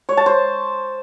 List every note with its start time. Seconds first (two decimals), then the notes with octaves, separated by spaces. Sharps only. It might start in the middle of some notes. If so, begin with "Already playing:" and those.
0.09 C#5
0.17 A5
0.26 C5